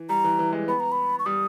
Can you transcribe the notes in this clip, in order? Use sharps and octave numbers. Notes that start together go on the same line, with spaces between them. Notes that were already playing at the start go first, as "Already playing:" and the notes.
Already playing: E3
G3 A#5
E3
E3
G#3
B3 B5
A#5
B5
C#6
G3 D#6